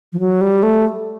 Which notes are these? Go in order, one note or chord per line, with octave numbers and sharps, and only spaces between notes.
F3
F#3
G3
A3